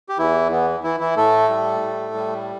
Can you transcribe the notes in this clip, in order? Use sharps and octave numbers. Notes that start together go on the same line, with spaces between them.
G4
E2 E3 E4
E3 B3
E3 E4
E3 E4
A2 A3 A4
G3
A2
G3